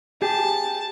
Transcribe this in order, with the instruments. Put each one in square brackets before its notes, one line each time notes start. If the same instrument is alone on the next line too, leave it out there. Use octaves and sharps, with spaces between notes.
[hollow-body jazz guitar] G4 G#4 [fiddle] A5